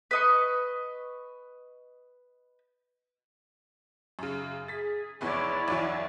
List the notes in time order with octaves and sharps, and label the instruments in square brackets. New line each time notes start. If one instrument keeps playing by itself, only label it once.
[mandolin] B4 D#5 C#6
[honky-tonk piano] F#2 C#3
[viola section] G#4 [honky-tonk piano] A6 B6
[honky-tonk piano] F1 E2 B3 [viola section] E4 C#5 D5
[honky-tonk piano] B1 E2 E3